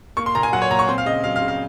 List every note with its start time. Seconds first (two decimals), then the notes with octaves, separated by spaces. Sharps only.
0.17 A#3 C#6
0.26 C6
0.35 A#2 A#5
0.43 G#5
0.53 F#3 F#5
0.62 C#5
0.70 A#2 A#5
0.79 C#6
0.88 C4 C6
0.98 F5
1.06 C#3 D#5
1.24 F#3 F5
1.36 F5
1.42 C#3
1.48 F5